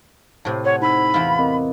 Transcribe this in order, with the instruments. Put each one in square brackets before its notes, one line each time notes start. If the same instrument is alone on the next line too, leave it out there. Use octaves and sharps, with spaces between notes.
[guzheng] A2 C3 [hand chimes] A5
[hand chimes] C5 F#5 G#6 [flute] C#5
[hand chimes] D#4 E6 [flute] B5
[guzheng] E2 E4 F4
[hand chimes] C4 A#4 D#5